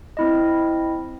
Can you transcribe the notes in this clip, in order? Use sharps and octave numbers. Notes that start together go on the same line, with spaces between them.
C4 E4 D#5